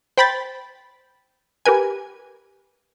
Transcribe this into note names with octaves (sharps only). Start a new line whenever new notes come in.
C5 G5 B5 G6 A6 B6
G4 A#4 B4 G#5